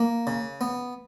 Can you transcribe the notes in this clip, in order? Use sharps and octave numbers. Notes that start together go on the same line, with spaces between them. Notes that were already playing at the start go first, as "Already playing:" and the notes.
Already playing: A#3
C#3
B3